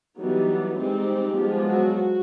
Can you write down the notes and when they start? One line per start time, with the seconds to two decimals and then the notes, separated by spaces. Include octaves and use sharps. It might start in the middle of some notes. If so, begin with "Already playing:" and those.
0.17 E3 F#3 G3 B3 D#4 F#4
0.75 G3 G#3 C4 D#4 G4
1.34 F3 G#3 B3
1.63 F#3 F#4
1.93 F#4